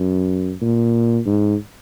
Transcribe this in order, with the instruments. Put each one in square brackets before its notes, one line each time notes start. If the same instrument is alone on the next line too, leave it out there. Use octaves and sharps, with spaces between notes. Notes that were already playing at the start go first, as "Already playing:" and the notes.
Already playing: [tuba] F#2
A#2
G#2